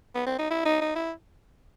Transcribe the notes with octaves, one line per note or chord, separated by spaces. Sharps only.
B3
C4
D#4
E4
D#4
D#4
E4